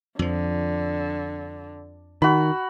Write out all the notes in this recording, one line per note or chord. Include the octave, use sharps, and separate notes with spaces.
F2 D3 F3
D#3 F#4 B5